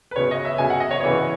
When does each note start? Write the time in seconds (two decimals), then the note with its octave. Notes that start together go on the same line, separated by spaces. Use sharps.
0.11 B4
0.16 C#3 F#3 B3 C#5
0.31 D#5
0.45 E5
0.58 C#3 F#3 B3 G#5
0.70 F#5
0.80 D#5
0.91 C#5
1.01 C#3 E3 B3 C#5